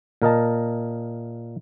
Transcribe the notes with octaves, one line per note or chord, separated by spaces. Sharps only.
A#2 A#4 D#5 A5